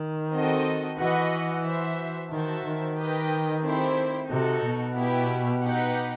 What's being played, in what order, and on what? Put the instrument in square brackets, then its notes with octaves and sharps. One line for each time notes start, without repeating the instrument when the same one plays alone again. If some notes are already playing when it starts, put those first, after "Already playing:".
Already playing: [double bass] D#3
[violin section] C4 F#4 A4 D#5
[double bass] E3 [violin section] F#4 B4 D#5 F#5
[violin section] F#4 C5 E5
[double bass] D#3 [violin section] F#4 C5 E5 A5
[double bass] D#3
[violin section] G4 B4 D#5 G5
A3 C4 E4 G4 C5
[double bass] C3 [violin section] D#4 F#4 A4
[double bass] B2
[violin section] B3 E4 G4
D#4 G4 B4 F#5